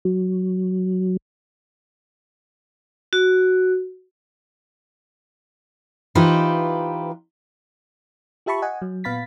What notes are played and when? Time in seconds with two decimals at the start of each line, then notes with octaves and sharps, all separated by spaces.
0.05 F#3
3.13 F#4
6.15 E3 D#4 F4 G4 B4 C5
8.46 F4 G4 E5 A5 B5 C#6
8.62 D#5 F#5 G#5
8.82 F#3
9.04 A#2 B3 F5 B5 A6 B6